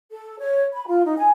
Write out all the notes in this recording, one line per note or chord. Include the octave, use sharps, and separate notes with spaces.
A4
C#5
B5
F4
D#4
G#5